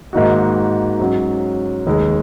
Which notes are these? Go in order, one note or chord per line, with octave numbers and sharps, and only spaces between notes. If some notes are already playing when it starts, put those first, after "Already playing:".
G#2 D#3 A#3 D#4 F#4
G#2 F#3 C#4
F1 D#2 D#3 G#3